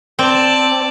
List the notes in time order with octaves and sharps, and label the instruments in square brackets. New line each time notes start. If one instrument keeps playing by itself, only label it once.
[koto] C4 [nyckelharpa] D5 A5